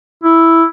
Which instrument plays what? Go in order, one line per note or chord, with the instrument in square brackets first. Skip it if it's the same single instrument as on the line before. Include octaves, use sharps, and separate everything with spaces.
[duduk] E4